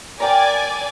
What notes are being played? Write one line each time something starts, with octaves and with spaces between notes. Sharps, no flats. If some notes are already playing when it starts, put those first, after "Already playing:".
A#4 D5 G5 G#5 A#5